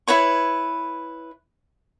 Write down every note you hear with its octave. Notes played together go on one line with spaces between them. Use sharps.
E4 B4 C#5 C#6